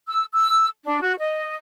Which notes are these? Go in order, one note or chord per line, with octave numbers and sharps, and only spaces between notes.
E6
E6
D4
F#4
D#5